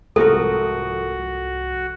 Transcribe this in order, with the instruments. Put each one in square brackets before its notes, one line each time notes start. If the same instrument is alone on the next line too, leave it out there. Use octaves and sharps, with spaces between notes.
[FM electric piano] C2 G#2 F3 [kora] A3 C4 A#4 [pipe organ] F#4 [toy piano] A4